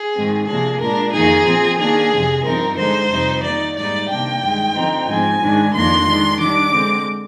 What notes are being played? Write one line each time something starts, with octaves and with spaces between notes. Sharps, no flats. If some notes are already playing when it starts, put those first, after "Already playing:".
Already playing: G#4
G#2 D#3 G#3 C4
C3 F3 A#3 D4 G#4
A#2 G#3 D4 A#4
F2 D#3 A#3 D#4 G#4
A#2 F3 C4
D#3 A#3 D4 G#4
F2 C3 F3
G2 F3 C4 D#4 A#4
D3 G#3 D#4 C5
F2 C3 G3 C4 D#4
D#3 A#3 D#4 D5
G#2 G3 A#3 D#4 D5
C3 D#3 A#3 D4 G5
G2 D#3 G#3
D3 F3 C4 D#4
G#2 F3 C4 D#4 G#5
G#2 D#3 G#3 D4
F2 D#3 A#3 D4 C6
D#3 G#3 D4
D#3 G3 D4 D6
D3 G#3 C4